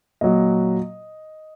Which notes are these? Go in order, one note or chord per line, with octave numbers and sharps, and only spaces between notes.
A#2 F#3 D#5